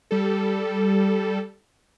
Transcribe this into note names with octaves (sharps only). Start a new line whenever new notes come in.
G3 A4